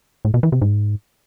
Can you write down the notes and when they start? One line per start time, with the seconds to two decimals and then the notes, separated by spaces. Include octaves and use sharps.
0.25 A2
0.34 B2
0.43 E3
0.52 C3
0.62 G#2